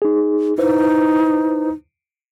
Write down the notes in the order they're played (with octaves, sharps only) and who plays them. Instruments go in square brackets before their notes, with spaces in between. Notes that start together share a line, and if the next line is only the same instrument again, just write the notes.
[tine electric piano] D#4 G#4
[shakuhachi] D#4 [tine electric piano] E4 B4 C5